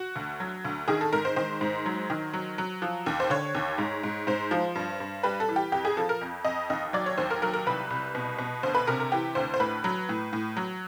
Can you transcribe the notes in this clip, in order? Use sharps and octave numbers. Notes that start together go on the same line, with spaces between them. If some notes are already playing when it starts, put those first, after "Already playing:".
Already playing: F#4
D2
F#3
D2
D#3 G#4
A4
G#2 A#4
C5
D#3 C5
G#2
F#3
D#3
F#3
F#3
F3
D#2
C5
D3 C#5
D#2
G#2
G#2
G#2 C5
F3
G2
G2
G3 B4
A4
E3
G4
F2 G4
G#4
F3 A4
A#4
F2
F2 D#5
D#2 D#5
F#3 D5
C#5
D#2 C5
A#4
F#3 A#4
A#4
C2 B4
C2
B2
B2
D2 C5
B4
C3 A#4
A#4
E3 G4
D2 C5
C5
A2 B4
F#3
A2
A2
F#3